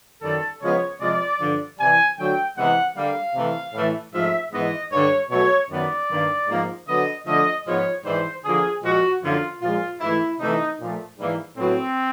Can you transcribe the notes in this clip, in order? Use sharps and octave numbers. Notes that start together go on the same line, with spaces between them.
F#2 D#3 G3 A4
C#3 F3 G#3 B3 C#5
C3 F3 G#3 D5
G2 D3 F3
C3 E3 G3 G#5
D3 F#3 A3 G5
C3 E3 G#3 B3 F#5
D3 G3 A#3 F5
C3 E3 A3
A2 E3 A3
G#2 F3 A3 E5
G#2 E3 G#3 B3 D#5
G2 D3 G3 C#5
B2 F#3 A3 C#5
F#2 D#3 G3 B3 D5
G2 D#3 G3 A#3
G#2 F3 A#3
D3 F#3 B3 D#5
D3 F3 A3 D#5
G#2 F3 G#3 B3 C#5
G#2 E3 G3 C5
D3 F3 A#3 G#4
A#2 F3 G#3 F#4
F#2 D3 F3 A#3 F4
A#2 F3 G#3 F4
G#2 E3 A3 E4
C3 E3 A3 D#4
A#2 F3 A3
G#2 E3 G3 A#3
A2 F#3 B3 C4